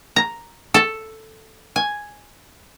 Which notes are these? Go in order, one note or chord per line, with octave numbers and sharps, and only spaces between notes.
A#5
A4
G#5